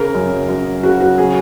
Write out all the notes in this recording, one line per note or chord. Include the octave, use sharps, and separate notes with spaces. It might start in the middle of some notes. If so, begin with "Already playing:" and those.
Already playing: C#3 A#4
F#2
F#2
C#3 F#4
F#4
C#3 G#4